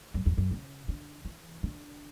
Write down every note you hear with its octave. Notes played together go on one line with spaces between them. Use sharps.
F#2
E2
F#2
C#3
D3
E3
D3